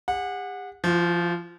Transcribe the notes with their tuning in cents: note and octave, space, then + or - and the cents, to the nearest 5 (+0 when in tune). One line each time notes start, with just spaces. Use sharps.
G4 +45 F#5 -20
F3 -20 F4 +45